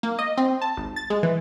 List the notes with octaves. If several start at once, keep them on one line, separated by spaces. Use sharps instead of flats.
A#3
D#5
C4
A5
G#1
A6
G#3
E3